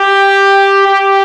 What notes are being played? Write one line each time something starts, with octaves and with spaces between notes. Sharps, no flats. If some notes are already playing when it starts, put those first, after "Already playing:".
Already playing: G4
G4